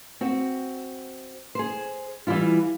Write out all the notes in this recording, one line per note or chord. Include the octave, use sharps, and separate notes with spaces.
C4 F#4
G#4 C5
E3 G3 E4 F4